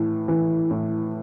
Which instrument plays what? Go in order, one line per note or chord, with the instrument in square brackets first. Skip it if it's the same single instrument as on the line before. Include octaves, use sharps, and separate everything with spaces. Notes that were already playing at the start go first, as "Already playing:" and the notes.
Already playing: [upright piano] A2 E3
E3
A2